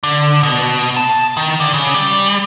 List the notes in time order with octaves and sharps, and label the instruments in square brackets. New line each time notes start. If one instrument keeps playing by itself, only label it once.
[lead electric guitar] D3
B2
A5
D#3
D3
C#3
G3